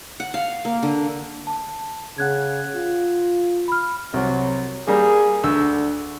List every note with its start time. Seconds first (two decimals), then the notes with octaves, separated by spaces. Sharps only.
0.20 F#5
0.34 F5
0.65 A#3
0.83 D3
1.47 A5
2.18 C#3 F#5 F#6 G#6
2.75 F4
3.68 B5 F6
4.14 C2 F#3
4.87 G3 A#3 G#4
5.44 D2 D3 E6